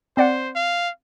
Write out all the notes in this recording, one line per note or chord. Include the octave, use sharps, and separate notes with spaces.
C4 C5 D5 F#5
F5